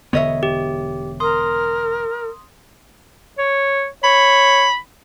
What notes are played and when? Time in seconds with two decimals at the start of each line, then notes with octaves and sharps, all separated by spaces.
0.13 E1 D3 B3 C#5 D#5 E5
0.43 G4
1.20 A#4 C6 D#6
3.38 C#5
4.04 C#5 B5